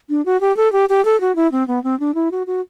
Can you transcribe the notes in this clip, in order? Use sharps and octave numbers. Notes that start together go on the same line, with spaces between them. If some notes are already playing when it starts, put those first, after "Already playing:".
D4
F#4
G4
A4
G4
G4
A4
F#4
E4
C4
B3
C4
D4
E4
F#4
F#4